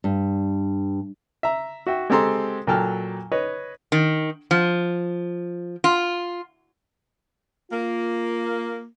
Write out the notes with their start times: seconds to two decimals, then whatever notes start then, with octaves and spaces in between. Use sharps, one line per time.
0.04 G2
1.43 E5 A#5
1.87 F#4 E5 G5
2.10 G#3 C4 G4 A4 A#5 C6
2.67 A#2 F#3 A4 G5 A5 F6
3.32 B4 C#5 D#5
3.92 D#3
4.51 F3
5.84 F4
7.71 A#3 F4